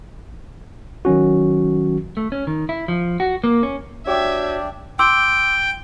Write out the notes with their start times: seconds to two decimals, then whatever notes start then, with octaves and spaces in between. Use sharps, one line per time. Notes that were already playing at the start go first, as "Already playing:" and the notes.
1.05 D#3 F#3 C#4 F#4
2.17 A3
2.32 C#4
2.47 D#3
2.69 E4
2.88 F3
3.20 F#4
3.44 A#3
3.63 C#4
4.07 D4 F#4 G4 C#5 E5 G#6
4.99 G5 C6 D6 E6